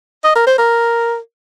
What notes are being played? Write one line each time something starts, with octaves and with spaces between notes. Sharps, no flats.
D#5
A#4
C5
A#4